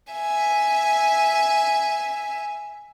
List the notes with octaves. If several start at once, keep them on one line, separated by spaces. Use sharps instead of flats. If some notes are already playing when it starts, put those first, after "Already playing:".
E5 G#5